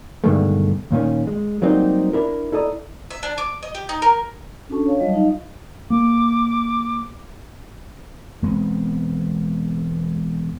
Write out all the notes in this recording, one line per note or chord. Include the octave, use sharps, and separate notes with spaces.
G2 B2 D3 D#3 G#3 A3
D#2 A#2 D#3 C#4
G#3
F#3 G3 A#3 C4 D#4 G4
D4 E4 A#4
E4 A4 D5 D#5 A#5
E5
D4
D6
D#5
G4
D#4
A#4
C#4 D4 F#4 A4 A5 C#6
C#5 F5 A5
F#3 G3 F4 D#5 F5
D#4 D#5 F5
A#3 D6
E1 G#3 B3 C4